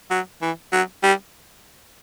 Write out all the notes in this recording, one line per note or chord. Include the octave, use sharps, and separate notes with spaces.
F#3
E3
F#3
G3